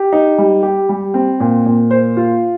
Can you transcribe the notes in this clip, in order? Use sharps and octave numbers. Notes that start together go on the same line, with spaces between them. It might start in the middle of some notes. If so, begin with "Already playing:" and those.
Already playing: G4
D#4
G3
G4
G3
C4
A#2
A#2
C5
F4